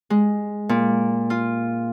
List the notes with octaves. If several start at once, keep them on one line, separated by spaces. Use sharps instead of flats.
G#3
A#2
F4